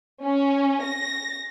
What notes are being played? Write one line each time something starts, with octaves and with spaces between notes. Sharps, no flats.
C#4
A#6